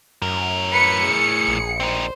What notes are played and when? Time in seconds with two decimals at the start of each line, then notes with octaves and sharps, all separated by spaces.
0.22 F#2 A2 A#4
0.73 B4 C#7
1.03 G#4
1.48 A#1
1.80 C4 D#4 C5